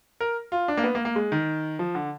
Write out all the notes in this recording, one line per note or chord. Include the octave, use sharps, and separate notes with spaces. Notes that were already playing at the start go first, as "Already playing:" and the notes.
A#4
F4
D4
A#3
B3
A#3
A#3
G#3
D#3
F3
D3